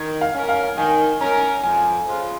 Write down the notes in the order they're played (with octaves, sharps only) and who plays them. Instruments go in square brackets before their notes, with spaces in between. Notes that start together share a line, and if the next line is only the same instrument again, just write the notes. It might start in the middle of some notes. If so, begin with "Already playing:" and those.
Already playing: [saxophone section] D#3 [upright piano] G#6
[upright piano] F5
[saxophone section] C#4 A#4
[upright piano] F5
[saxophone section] D#3 [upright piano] G#5
[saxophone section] C#4 A#4 [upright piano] A#5
[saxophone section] F2 [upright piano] G#5
[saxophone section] C#3 F3 G#3 F4